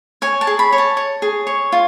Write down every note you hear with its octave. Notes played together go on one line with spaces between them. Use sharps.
C#5 G#5
A5
G#4
B5
C#5
A5
C#5
G#4
C#5
F4